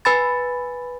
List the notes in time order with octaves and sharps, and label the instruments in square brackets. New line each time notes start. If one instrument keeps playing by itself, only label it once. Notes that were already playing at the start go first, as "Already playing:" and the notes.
[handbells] B4 G#5 B5 A6